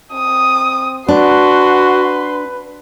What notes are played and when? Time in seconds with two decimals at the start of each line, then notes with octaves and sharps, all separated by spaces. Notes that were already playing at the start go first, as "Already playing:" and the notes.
0.13 C4 D#6
1.08 D4 F#4 B4 C6